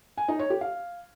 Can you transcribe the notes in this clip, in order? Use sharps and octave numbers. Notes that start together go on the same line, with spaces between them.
G#5
D#4
C#5
G4
F5